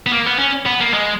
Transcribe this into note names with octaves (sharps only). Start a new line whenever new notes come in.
B3
A#3
B3
C#4
B3
A#3
G#3